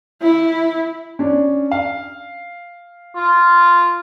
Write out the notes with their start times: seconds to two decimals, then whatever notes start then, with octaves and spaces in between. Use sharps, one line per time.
0.22 E4
1.19 C#4 D4
1.71 F5
3.16 F4